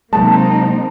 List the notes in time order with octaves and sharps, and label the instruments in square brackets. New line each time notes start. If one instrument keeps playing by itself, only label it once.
[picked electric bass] C3 F#3 G#3 [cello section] A#3 C4 D#4 [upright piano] A5